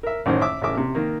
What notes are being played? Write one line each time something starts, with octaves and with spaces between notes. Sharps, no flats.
A#4 E5
A1 F#2 D#3 C5
E5 D6 E6
A1 C#3 A#4 E5 D6
C3
D#3 A#3